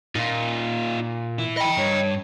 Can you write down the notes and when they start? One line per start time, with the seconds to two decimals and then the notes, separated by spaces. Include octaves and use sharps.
0.16 A#2 D#4 F4
1.39 E3 E4
1.57 D#5 G5 B5
1.77 G2 C#5